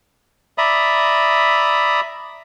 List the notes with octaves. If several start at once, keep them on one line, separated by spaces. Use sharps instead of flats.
D5 E5 A#5 B5 D#6